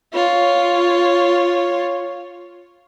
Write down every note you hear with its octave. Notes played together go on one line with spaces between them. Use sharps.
F4 C#5